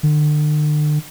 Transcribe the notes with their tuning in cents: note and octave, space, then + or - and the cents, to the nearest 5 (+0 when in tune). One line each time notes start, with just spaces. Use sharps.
D3 +40